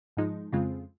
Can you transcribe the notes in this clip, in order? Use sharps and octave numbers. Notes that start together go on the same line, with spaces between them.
G#2 F3 G#3 D#4
F2 C#3 G#3 C4 F4